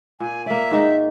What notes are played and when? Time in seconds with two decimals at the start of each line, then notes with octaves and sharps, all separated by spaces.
0.20 A#2 G#5
0.46 A#3 D5 E5
0.71 G#2 D#3 D#4